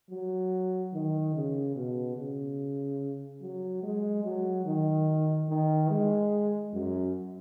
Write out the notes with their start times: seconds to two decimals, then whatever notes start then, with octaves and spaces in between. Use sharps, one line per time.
0.10 F#3
0.93 D#3
1.34 C#3
1.75 B2
2.17 C#3
3.41 F#3
3.83 G#3
4.24 F#3
4.65 D#3
5.49 D#3
5.90 G#3
6.73 F#2